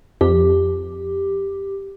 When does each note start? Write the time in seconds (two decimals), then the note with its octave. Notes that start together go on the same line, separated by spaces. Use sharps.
0.21 F2 G4